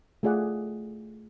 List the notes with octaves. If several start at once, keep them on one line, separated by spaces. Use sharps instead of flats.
A3 F4 G#4 D5 F#5